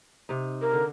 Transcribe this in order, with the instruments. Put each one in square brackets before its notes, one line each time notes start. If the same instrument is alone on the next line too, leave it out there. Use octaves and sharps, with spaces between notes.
[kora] C3 D#4
[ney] A#4
[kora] D3